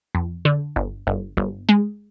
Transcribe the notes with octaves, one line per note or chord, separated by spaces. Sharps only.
F2
D3
G1
G1
G1
G#3